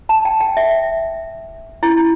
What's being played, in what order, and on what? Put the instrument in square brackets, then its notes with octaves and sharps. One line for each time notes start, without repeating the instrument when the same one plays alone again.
[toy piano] A5
G5
G5
E5
E4